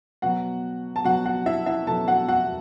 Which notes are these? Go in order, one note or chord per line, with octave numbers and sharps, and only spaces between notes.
B2 F#3 F#4 F#5
A5
B2 F#3 F#4 F#5
F#4 F#5
E4 E5
E4 E5
B2 F#3 A4 A5
F#4 F#5
F#4 F#5